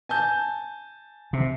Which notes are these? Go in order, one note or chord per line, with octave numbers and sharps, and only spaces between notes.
G#5 A5 G6
C3